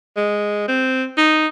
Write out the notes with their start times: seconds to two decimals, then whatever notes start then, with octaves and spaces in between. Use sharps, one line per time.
0.17 G#3
0.68 C4
1.17 D#4